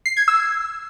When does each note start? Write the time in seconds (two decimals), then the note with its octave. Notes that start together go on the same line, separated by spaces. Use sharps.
0.06 C7
0.17 G#6
0.28 E6